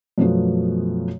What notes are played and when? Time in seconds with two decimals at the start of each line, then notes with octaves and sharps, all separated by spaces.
0.18 F#2 B2 F3 A3 B3